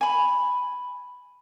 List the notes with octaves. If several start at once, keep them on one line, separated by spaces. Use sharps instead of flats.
G#5 B5